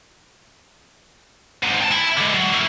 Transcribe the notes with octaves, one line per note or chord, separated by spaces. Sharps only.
G#2 C3
G5 A5
E4
D3 G#3
F#3
A#3 E4